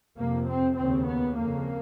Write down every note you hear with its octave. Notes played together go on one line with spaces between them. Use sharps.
F2 C3 A#3
C4
D#2 C#3 C4
B3
F2 C#3 A#3